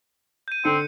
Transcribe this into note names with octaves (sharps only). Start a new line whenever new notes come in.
G6 D#7
D3 C4 C#7